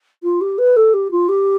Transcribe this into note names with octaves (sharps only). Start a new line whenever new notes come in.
F4
G4
B4
A4
G4
F4
G4